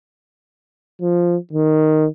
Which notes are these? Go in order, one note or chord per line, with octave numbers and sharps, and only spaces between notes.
F3
D#3